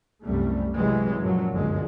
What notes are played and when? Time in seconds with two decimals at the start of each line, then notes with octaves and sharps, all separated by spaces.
0.25 C2 F#2 G3 A3
0.74 C3 E3 F#3 G#3
1.21 F#2 A#2 F3 F#3
1.52 G1 C#2 F#2 D3 F3 G#3